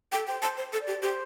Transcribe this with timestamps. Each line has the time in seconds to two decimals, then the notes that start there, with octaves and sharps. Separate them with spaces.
0.12 A4 G5
0.27 C5 G5
0.42 C5 A5
0.57 C5
0.73 A4
0.80 D5
0.87 G4
1.02 G4 C5